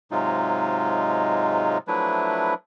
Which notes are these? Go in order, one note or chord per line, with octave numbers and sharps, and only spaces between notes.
G#2 C3 F#3 G#3 D#4 F4
F3 F#3 A3 D4 E4 B4